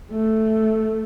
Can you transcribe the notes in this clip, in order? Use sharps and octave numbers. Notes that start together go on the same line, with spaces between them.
A3